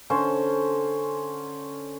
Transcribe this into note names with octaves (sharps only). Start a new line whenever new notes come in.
D3 C#4 C5